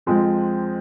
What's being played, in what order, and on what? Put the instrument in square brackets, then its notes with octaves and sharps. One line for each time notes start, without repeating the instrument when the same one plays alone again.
[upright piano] F2 F3 G#3 C4